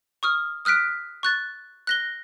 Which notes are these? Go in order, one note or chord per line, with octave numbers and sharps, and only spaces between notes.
C#6 D#6 F6
D#6 F6 F#6 B6 D7
C#6 F#6 A6
F#6 A#6 G7